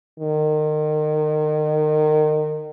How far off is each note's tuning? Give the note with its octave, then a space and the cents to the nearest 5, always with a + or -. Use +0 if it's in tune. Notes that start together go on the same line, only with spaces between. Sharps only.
D#3 -30